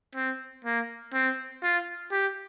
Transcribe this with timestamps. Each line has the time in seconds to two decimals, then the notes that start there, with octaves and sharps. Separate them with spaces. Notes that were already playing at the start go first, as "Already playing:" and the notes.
0.16 C4
0.65 A#3
1.14 C4
1.63 F4
2.11 G4